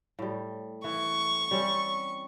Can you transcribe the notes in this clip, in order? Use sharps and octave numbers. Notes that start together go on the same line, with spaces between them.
A2 G3
E3 C#6
G3 C4 C#4